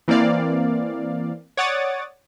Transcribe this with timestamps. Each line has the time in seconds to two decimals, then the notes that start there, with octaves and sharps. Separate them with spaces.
0.08 E3 A#3 C4 D5 F5
1.57 C#5 D5 F#5 D6 D#6 A6